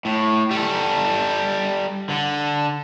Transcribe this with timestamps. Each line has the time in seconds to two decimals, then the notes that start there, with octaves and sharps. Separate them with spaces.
0.05 A2
0.51 G3 A4
2.10 D3